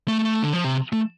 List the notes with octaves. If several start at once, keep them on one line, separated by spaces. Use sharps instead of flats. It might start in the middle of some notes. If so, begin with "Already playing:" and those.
A3
A3
D3
F3
C3
A3